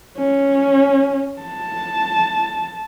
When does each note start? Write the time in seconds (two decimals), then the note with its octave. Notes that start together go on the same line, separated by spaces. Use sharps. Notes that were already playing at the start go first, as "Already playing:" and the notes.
0.18 C#4
1.42 A5